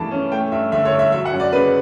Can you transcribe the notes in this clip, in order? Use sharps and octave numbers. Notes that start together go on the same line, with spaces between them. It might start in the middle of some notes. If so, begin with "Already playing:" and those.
Already playing: G2 E3 A3 B3 A5 B5
C#4
A3 G5
G2 E5
D3 E5
C#5
G2
E5
F#3 E5
F#5
F#2
D5
C#3 B4